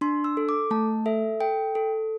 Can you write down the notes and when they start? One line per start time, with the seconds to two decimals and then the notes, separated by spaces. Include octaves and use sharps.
0.01 D4 C6
0.24 E6
0.37 A4
0.49 D6
0.71 A3 A5
1.06 A4 E5
1.40 A4 G5
1.75 A4